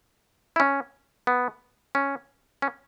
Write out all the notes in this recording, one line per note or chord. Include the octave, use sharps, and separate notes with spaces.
E4
C#4
B3
C#4
C#4